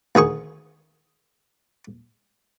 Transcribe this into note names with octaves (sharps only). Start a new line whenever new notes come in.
D2 D#3 G#4 C#6